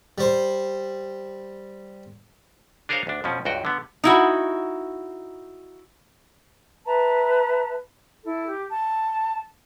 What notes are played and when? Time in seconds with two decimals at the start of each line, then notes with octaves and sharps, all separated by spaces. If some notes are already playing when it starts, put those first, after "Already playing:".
0.18 G3 C5
2.89 D4 G#4 A#4 C5 C#5 F5
3.07 D2 D4
3.24 F2 B2 F3 C#4
3.45 C#2 G2 F#4 G5
3.65 D3 B3
4.04 D#4 E4 F#4
6.85 B4 E5 A5 A#5
8.24 E4 A4
8.45 G4
8.70 A5